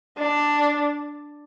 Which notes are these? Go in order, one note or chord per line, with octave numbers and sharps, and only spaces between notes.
D4